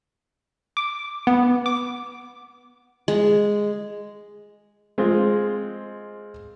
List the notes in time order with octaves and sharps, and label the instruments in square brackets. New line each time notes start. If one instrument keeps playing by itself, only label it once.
[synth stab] D6
B3
D6
[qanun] G#3
[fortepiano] G#3 C4 F4